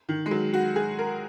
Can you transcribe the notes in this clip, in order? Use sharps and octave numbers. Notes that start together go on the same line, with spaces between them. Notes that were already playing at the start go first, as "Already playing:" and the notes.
D#3
G#3
F#3
F#4
G#4
A#4